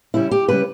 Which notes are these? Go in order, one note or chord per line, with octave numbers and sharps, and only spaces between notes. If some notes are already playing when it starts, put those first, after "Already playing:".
C#3 G3 C#4 E4
G4
C#3 G3 C#4 B4